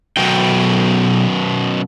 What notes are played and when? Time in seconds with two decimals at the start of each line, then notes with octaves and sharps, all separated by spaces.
0.17 B1 F#2 B2 G5